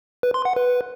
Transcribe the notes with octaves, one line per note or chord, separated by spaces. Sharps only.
B4
C6
F#5
B4